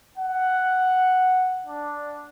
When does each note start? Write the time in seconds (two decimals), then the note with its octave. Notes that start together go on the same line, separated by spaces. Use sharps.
0.18 F#5
1.67 D4